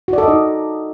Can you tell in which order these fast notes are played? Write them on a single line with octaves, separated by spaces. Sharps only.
F#4 D5 A4 D#5 D#4